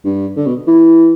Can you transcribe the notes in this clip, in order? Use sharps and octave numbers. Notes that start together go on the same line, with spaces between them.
G2
D3
B2
E3